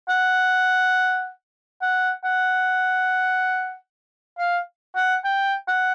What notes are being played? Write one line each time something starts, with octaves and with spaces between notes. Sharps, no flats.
F#5
F#5
F#5
F5
F#5
G5
F#5